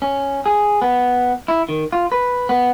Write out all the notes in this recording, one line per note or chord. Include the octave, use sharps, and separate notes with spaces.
C#4
G#4
B3
E4
D#3
F4
B4
B3